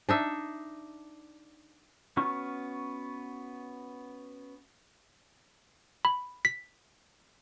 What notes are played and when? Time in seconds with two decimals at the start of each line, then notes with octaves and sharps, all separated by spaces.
0.09 D4 D#4 E5
2.17 B3 C#4 F#4 C#6 F6
6.05 B5
6.45 B6